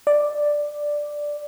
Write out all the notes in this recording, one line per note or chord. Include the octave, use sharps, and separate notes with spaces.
D5